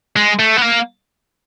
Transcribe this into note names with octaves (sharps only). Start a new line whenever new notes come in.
G#3
A3
B3
A#3